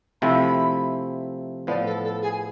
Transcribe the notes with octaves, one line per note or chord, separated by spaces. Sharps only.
C3 F3 A3 C4 E4 B5
A2 F3 B3 D5
A4
A4
G#4